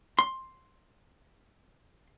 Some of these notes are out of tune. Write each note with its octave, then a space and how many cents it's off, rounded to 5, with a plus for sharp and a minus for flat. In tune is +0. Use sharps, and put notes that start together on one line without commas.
C6 +10